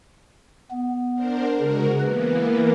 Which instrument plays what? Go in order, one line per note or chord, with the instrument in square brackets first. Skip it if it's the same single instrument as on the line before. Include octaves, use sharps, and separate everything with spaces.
[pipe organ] B3
[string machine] D4 A#4 C5
[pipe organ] C#3 [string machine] G#3 F#4 A#4
[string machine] E3 A#3 B3 [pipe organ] B4